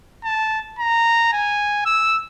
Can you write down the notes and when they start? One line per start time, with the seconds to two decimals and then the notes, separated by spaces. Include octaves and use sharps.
0.24 A5
0.79 A#5
1.32 G#5
1.86 E6